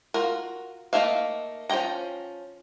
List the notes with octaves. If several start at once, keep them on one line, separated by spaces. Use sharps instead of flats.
F4 F#4 A#4
A3 A#3 D#4 E5 F5
F3 C#4 D5 G5 A#5